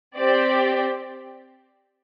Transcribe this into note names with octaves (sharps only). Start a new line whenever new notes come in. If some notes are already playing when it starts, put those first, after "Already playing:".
C4 G4 D5